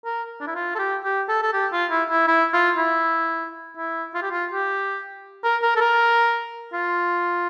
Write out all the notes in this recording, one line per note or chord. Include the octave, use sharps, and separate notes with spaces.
A#4
D4
E4
F4
A4
G4
G4
A4
A4
G4
F4
E4
E4
E4
F4
E4
E4
F4
G4
F4
G4
A#4
A#4
A4
A#4
F4